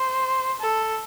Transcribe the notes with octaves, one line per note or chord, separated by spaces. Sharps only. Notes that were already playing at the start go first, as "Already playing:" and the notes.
Already playing: C5
A4